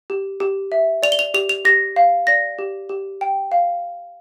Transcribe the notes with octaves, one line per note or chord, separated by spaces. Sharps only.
G4
G4
E5
D5 F7
G7
F7
G4 F7
F7
G4 A#6
F5
D5 A#6
G4
G4
G5
F5